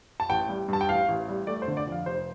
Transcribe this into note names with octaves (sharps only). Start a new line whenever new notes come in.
A5
A1 G5
G3
G2 A5
G5
A1 F5
A1
G3
A3 D5
C5
D3
D5
F2 F5
F1 C5